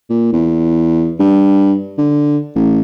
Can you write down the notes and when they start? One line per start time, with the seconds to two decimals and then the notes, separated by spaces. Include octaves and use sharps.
0.10 A#2
0.33 E2
1.19 G2
1.98 D3
2.56 A1